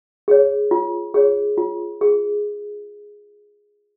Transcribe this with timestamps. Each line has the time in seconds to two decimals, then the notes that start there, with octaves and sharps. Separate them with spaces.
0.28 G#4 C#5
0.71 F4
1.14 G#4 C#5
1.58 F4
2.01 G#4